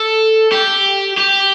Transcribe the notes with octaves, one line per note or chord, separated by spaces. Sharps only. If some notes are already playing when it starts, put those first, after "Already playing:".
Already playing: A4
G4
G4